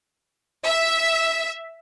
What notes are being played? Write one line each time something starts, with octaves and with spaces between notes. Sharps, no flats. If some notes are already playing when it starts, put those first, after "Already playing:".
E5